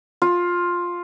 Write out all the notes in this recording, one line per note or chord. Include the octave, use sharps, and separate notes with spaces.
F4